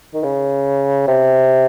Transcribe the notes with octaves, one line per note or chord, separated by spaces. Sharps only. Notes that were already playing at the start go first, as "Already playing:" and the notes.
D#3
C#3
C3